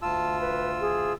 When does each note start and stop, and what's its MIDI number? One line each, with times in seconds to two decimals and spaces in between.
0.02 1.13 38
0.02 1.13 65
0.02 0.39 81
0.02 1.13 88
0.41 0.70 71
0.81 1.13 68